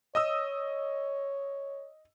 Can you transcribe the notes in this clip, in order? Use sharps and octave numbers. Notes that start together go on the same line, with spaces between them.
C#5 D#5 D#6 E6